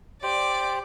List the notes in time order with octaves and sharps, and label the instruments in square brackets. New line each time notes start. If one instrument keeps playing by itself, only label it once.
[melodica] G4 C5 [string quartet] D5